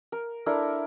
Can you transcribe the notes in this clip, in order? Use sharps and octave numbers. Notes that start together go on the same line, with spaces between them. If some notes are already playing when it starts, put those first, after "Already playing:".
A#4
D4 E4 A4 A#4